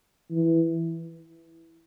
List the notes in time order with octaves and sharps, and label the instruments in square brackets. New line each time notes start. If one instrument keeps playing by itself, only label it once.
[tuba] E3